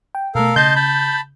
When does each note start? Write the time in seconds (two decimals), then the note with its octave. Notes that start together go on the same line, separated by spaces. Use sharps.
0.15 G5
0.35 B2 A3 A4 A#4 F5
0.56 C#3 D#5 A5 C6 G6
0.76 A5 B5